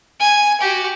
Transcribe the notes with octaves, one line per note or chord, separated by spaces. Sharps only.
G#5
F#4 G4